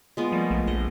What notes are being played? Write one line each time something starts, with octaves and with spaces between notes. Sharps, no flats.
G#3 B3 F4
F3 G3 A3 A#3
A#1
A#1 D#5